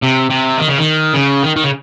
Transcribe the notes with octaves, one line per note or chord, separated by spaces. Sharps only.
C3
C3
D#3
C#3
D#3
C#3
D#3
D#3
C#3